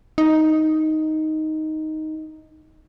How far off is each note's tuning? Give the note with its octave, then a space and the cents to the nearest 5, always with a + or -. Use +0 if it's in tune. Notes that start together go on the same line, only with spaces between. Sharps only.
D#4 +5